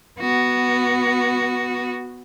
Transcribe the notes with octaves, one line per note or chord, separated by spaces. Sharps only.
B3 F#4